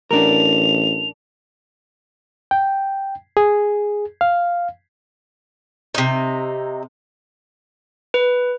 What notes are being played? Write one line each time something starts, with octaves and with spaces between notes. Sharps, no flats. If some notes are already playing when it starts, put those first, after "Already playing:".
A1 D4 A#4 F7
G5
G#4
F5
C3 D#4
B4